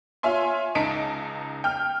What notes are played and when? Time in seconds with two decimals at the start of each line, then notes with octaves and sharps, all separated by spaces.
0.23 F4 C#5 E5 G#5 C6
0.75 C#2 D#4 D#5 A5 B6 D7
1.64 G5 F6